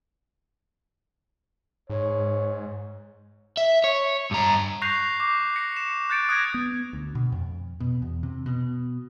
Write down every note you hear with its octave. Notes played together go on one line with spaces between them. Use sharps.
G#2 C#5
E5
C#5
G2 A#5
C#6 F#6 G6 A#6 C7 F7
D6 C7
A#6 C#7
E7
F#6 G6 A6 C#7 D7
D#6 F#6 G#6 A#6
B3
D2
B2
F2
B2
E2
C3
B2